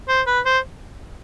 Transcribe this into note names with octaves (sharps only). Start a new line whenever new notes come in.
C5
B4
C5